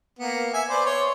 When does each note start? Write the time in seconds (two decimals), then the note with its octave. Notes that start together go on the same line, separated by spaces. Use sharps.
0.19 A#3 B3
0.53 E5 G#5
0.69 B4 C5 D5
0.86 C#5 C6